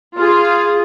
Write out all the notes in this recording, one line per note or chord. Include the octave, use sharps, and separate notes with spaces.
F4 G#4